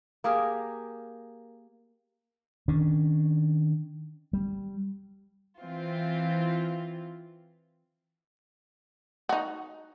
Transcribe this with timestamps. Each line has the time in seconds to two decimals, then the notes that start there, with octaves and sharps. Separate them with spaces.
0.24 A#3 G4 G#4 A#4
2.68 D#3 C#4 D4
4.33 G3
5.60 E3 C4 F4
9.29 D#4 F#4